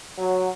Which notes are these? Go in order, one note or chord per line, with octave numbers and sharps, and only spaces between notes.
F#3